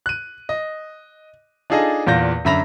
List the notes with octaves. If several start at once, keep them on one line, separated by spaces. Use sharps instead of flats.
F#6 D#7
D#5
D4 D#4 F4 G#4 A4 D#5
E2 A#2 F4 G6 A#6
F#2 D3 E5 B5 A#6 F7